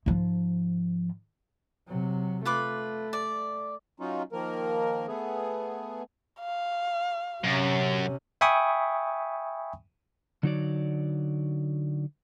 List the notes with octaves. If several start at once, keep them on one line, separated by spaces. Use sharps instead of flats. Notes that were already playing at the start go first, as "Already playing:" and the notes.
G#2 F3
C3 F#3
A3 F4 B4 D6
D5
F#3 C#4 D#4 F4
D#3 F3 A#3 A#4
A3 B3 G#4
F5
F#2 C3 C#4
E5 G5 G#5 B5 C#6 D#6
D3 F#3 D#4 F#4 C#5 D5